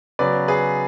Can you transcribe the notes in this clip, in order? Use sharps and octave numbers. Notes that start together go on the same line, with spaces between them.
C#3 F#3 B3 B4 D5
G#4 B4